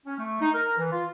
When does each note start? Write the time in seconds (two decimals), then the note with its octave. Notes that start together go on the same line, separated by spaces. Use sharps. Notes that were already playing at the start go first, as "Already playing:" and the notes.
0.06 C#4
0.18 A3
0.40 D#4
0.54 A#4
0.78 E3
0.92 F4